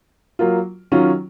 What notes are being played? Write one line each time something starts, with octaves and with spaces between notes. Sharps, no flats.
F#3 A#3 F4
D#3 F#3 C#4 F4